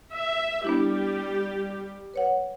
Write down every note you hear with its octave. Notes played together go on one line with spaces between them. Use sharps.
E5
G3 B3 D4 E4 G4
B4 C#5 F#5